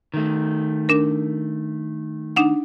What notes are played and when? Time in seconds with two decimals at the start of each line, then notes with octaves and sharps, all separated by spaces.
0.14 D#3 A3
0.89 D4 A#4
2.36 D4 D#4 F#5